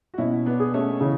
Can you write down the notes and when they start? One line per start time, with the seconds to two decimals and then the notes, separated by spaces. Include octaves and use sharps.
0.14 F#4
0.18 B2 C#4 E4
0.46 B3 D4
0.60 G#4
0.74 A3 C#4
1.01 C#3 E3